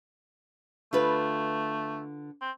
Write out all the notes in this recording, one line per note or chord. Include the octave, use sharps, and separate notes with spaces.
D3 A3 F4 B4
C4